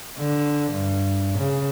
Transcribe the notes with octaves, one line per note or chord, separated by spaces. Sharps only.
D3
G2
C#3